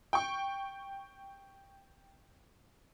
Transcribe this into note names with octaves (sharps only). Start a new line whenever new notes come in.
G5 C#6